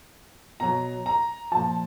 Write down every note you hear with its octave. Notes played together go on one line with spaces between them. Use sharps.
B2 F#3 A#5
A#5
A#2 F3 A5